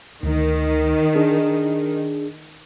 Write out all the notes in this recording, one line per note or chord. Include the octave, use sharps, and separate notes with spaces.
D2 D#3
D4 G#4